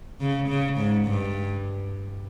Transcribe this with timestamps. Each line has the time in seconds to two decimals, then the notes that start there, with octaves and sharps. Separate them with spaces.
0.20 C#3
0.49 C#3
0.77 G#2
1.07 G2